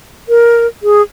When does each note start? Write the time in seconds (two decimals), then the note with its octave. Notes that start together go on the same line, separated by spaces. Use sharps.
0.29 A#4
0.83 G#4